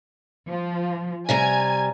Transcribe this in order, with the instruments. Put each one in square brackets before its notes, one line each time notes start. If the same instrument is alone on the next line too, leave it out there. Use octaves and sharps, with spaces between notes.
[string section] F3
[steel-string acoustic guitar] C3 G3 A#5 [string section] G#5 G#6